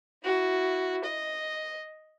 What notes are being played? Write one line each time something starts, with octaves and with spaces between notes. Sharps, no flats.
E4 F#4
D#5